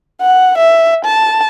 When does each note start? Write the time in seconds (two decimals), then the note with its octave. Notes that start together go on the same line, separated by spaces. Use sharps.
0.22 F#5
0.58 E5
1.05 A5